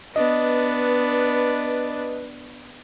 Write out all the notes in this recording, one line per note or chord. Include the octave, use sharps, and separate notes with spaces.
B3 D4 B4 D#5